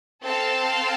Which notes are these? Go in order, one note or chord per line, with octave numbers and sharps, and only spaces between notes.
C4 A4 F5 A5